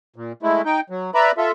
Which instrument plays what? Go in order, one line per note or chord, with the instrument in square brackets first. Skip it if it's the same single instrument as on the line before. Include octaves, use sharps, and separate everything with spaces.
[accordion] A#2
G#3 A3 E4
D#4 G5
F#3
B4 D5 E5 A#5 B5
F4 A4 E5